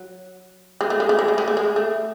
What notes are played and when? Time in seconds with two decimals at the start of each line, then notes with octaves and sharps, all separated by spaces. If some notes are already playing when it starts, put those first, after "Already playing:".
Already playing: F#3
0.81 G#3
0.90 A3
1.00 G#3
1.09 A3
1.19 G#3
1.28 A3
1.38 G#3
1.48 A3
1.57 G#3
1.76 A3